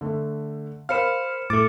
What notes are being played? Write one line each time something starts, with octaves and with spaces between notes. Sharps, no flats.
D3 A3
A#4 C5 F5 B5 F6 C#7 E7
A2 A3 D6 A6 C#7